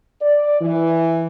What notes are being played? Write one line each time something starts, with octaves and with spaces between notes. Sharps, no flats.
D5
E3